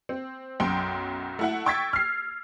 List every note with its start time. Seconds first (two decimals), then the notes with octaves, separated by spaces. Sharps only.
0.09 C4
0.60 B1 F#2 G5 C6
1.39 A3 E4 F#5
1.66 G5 C#6 E6 G#6 A6 B6
1.93 F6 C7